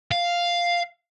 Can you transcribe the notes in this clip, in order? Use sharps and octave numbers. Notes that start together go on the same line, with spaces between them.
F5